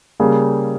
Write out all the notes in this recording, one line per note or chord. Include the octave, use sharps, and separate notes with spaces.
C#3 G3 A#3